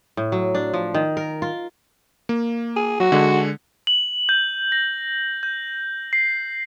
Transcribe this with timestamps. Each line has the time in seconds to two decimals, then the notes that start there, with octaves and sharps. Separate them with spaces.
0.17 A2
0.32 F#3
0.55 D4
0.73 F3
0.94 D#3
1.17 A#4
1.42 F4
2.29 A#3
2.76 G#4
3.00 F#3 F#4
3.12 D3 G#3
3.87 F#7
4.29 G6
4.72 A#6
5.43 G6
6.13 C7